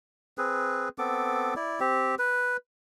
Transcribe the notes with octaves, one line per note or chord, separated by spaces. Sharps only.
C4 G#4 B4
B3 C4 A4 D6
E4 D5
C4 G4
B4